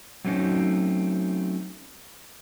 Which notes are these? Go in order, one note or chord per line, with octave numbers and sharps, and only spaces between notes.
F#3 A3 C4 C#4 D#4 F#4